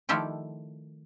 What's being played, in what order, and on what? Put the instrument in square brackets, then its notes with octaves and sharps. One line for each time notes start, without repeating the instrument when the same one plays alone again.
[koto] D#3 F3 A3 E4 G4 D5